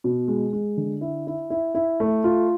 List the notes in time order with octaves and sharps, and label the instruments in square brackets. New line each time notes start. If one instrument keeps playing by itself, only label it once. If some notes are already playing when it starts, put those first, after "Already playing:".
[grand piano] B2
G#3
G#3
D3
E4
E4
E4
E4
A3
F4